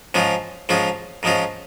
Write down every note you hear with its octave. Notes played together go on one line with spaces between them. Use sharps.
G#2 F3 G#3 C#4 F4
G#2 F3 G#3 C#4 F4
G#2 F3 G#3 C#4 F4